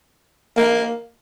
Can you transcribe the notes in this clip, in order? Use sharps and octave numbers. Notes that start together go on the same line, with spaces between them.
A#3